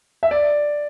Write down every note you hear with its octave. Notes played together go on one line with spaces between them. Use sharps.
E5
D5